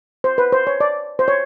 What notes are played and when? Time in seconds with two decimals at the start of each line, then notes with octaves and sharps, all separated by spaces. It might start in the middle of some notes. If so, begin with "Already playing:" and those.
0.24 C5
0.38 B4
0.52 C5
0.67 C#5
0.81 D5
1.19 C5
1.28 C#5